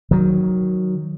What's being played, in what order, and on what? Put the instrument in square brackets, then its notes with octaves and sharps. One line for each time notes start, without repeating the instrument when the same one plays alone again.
[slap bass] D#3 F#3